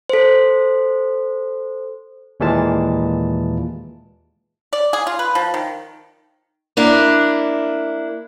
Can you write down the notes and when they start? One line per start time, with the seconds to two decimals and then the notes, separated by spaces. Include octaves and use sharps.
0.09 A4 C5
2.40 D#2 A#2 E3 G#3 A5
4.73 D5
4.93 G#4
5.07 F4
5.19 B4
5.35 F3
5.54 D#3
6.77 A#3 D4 E4